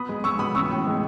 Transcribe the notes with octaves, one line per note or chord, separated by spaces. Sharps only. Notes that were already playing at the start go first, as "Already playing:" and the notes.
Already playing: B3 B5 D#6
G#3
G#3 C#6 E6
B3 B5 D#6
A1 C#6 E6
A2
G#3